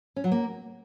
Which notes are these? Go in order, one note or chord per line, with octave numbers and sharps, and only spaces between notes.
C#4
F#3
A#3